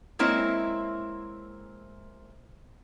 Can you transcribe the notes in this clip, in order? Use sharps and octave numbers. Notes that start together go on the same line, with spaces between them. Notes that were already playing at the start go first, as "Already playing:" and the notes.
G#3 A#3 C4 E4 C#5 E5